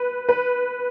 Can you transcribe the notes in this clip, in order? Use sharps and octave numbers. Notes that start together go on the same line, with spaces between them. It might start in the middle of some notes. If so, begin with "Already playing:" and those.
Already playing: B4
B4